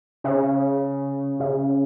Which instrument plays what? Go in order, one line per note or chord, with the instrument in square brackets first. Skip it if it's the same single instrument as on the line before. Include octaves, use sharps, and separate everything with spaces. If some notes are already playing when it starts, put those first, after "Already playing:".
[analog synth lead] C#3
C#3